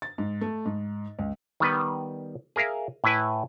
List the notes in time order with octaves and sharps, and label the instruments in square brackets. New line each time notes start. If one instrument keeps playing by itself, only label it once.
[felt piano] A6
G#2
A3
G#2
C#2
[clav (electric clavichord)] D#3 G3 B3 B4
G#4 A#4 E5 F5
A2 E4 B4 G#5